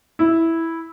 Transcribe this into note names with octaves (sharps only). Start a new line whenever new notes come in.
E4